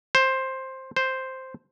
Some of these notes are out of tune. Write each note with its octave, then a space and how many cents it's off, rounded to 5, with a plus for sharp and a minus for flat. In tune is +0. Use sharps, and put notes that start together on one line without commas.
C5 +10
C5 +0